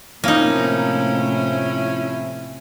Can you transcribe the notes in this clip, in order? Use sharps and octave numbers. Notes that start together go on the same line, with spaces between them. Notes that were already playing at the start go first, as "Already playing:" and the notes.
A2 C3 F3 A#3 C4 C#4 D#4 E4